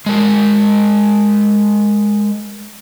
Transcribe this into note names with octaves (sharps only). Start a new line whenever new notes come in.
G#3 A#4